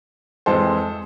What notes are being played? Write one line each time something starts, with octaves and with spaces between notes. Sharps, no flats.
F2 E3 G#3 C4 A4 C5